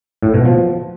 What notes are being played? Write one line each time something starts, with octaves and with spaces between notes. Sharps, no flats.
A2
B2
F3